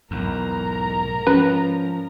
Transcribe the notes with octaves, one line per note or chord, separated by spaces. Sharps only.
B1 E2 G#2 A#4 A#5
F3 C#4 B4